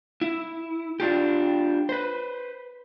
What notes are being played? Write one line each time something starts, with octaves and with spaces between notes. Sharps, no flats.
E4
D4 F4 G4
B4 C5